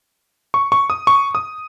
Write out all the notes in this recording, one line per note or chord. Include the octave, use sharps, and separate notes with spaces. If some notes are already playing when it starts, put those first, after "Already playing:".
C#6
C#6
D#6
C#6
D#6